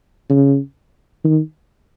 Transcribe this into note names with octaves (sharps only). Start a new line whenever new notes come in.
C#3
D#3